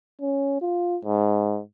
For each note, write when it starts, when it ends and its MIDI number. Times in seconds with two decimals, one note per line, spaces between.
0.21 0.58 61
0.62 0.98 65
1.05 1.60 44